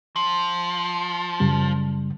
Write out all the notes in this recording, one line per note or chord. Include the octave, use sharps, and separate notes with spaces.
F3
F#2 C#3 G3